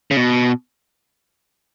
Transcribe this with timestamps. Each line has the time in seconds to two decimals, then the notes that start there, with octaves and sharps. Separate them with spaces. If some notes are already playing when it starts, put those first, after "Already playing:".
0.11 C#3
0.17 B2